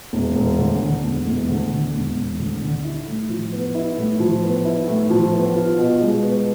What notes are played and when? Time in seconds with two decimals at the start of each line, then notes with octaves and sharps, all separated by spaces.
0.13 E1
0.35 E1
0.58 D2
0.80 D3
1.03 E1
1.26 E1
1.48 D2
1.71 D3
1.94 E1
2.16 E1
2.39 D2
2.61 D3
2.84 E4
3.07 A2
3.29 F3
3.52 B3
3.74 E4
3.97 A2
4.20 F3
4.42 B3
4.65 E4
4.87 A2
5.10 F3
5.33 B3
5.55 F4
5.78 B2
6.01 G#3
6.23 B3